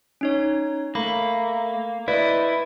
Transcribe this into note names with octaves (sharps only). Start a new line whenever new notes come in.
C#4 D#4 C#5
A3 A#3 B5
E4 B4 C5 D5 D#5